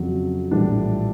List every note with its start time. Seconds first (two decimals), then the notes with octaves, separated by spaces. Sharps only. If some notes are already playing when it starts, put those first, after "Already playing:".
Already playing: F2 C#3 F#3
0.51 A#1 A2 E3 G3 D4